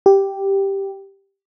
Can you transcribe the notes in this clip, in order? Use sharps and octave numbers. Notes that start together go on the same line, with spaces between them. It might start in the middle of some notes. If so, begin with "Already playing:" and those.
G4